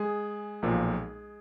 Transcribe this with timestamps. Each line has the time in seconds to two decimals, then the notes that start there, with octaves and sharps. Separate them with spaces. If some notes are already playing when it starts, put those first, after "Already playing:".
Already playing: G#3 G#4
0.62 B1 A#2 F3